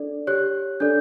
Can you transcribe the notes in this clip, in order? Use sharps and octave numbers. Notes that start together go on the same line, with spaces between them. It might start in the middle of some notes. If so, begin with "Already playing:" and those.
Already playing: D4 A4 D5
G4 C#5 F#6
D4 A4 D5 G6